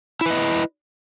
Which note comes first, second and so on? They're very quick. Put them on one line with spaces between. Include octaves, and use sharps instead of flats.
E4 B4 D#5